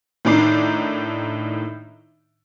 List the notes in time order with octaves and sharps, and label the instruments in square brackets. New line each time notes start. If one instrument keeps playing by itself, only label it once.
[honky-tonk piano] A2 D#3 D4 D#4 D6 C7